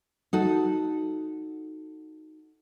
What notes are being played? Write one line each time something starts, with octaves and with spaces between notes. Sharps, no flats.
D#4 F#4 A4